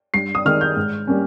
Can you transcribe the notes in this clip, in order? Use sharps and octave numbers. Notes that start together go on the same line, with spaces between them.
G2 C7
D#6
D#3 G#3 F6
G6
G#2
G3 A#3 C#4